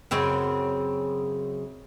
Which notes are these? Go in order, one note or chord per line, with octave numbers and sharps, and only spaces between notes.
F#2 C#3 C4